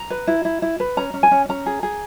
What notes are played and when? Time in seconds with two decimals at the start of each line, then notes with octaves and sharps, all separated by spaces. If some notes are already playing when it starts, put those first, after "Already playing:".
Already playing: A#5
0.10 B4
0.27 E4
0.45 E4
0.62 E4
0.80 B4
0.97 C#4 A#5
1.14 C#4
1.23 G#5
1.31 C#4
1.49 C#4 A#5
1.66 G#4
1.83 G#4